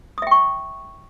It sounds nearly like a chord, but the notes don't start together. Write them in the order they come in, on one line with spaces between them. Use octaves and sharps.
D#6 E5 G5 C#6